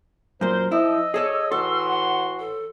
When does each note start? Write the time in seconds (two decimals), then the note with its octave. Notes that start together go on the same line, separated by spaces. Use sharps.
0.41 F#2 A#2 A#4 C5
0.72 F3 E4 D#5 E6
1.14 G#4 A4 C#5 D5
1.52 A2 E3 F#4 A4 C6
1.89 F#5
2.39 A4